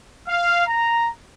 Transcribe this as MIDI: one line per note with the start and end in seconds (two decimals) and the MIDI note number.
0.28 0.65 77
0.67 1.09 82